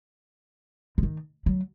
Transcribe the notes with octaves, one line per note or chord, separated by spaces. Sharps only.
D3
D#3
F#3